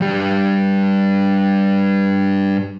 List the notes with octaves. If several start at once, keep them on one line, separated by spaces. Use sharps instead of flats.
G2 G3